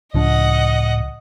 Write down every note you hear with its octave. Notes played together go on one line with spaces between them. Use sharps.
C#2 A2 F3 D4 D#5 F#5